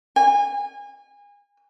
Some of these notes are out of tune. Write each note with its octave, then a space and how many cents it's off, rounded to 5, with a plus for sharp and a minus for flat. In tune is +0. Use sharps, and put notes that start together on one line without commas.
G#5 -30